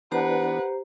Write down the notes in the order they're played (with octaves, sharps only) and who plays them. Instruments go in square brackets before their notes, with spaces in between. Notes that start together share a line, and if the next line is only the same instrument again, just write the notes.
[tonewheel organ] E3 B3 D4 [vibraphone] G4 C5 A#5 [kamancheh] B4 F#5